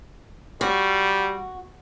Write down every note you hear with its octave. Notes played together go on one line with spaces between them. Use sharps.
G3 F#4